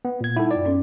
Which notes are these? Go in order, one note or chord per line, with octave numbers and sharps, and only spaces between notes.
B3
A#2 G#6
G3 D#4 E4 A4 F#5
F#2 F4 D5
B3 C#4 A4